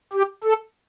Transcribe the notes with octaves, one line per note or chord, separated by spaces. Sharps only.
G4
A4